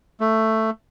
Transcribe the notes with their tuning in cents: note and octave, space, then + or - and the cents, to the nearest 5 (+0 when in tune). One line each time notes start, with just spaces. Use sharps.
A3 +10